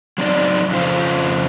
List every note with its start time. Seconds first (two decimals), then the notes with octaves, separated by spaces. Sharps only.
0.18 F#3 C4 D#4 D5
0.70 F2 C#3 F3 F4 C5